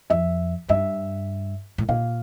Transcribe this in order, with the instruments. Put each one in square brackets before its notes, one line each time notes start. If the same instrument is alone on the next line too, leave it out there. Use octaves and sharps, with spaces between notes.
[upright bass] F2 [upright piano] E5
[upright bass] G2 [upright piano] E5
[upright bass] A2
[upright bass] A#2 [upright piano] F5